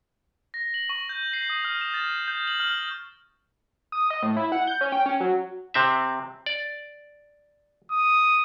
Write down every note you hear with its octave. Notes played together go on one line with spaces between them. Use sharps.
A#6
F#7
C#6
G6
C7
D#6
F6
E7
A6
G6
F#7
F6
D#6
D#5
A2
E4
F#5
G6
C#4
G5
C#4
F#3
C3 C4 E5
D5
D#6